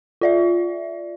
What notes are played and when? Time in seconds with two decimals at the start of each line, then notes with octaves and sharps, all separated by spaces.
0.21 F4 D5 E5